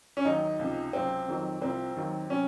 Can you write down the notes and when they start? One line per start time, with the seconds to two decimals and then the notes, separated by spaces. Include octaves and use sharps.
0.17 C#4
0.25 D#2 D#3 F#3 D#4
0.59 C#2 C3 F3
0.93 C#2 C3 F#3 C4
1.28 F2 D#3 F#3
1.61 C2 C3 F3 C4
1.96 D#2 D#3 F#3
2.30 C3 F#3 C#4